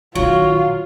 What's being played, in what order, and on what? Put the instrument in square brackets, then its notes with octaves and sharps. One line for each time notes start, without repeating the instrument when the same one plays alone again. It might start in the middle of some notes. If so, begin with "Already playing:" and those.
[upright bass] A#1 D#3 [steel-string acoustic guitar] F#3 [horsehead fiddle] F4 [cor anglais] C#5